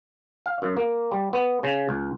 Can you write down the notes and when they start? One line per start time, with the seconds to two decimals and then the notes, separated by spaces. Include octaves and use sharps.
0.46 F5
0.62 F#2
0.77 A#3
1.12 G3
1.33 B3
1.63 C#3
1.89 C#2